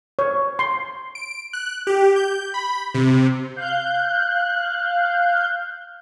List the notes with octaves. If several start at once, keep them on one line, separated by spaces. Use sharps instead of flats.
C#5
C6
D7
F#6
G4
G6
B5
C3
F5 F#6 G6